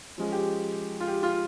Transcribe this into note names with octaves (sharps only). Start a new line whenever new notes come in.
F3 G#3 C#4
G4
F4
G4
F4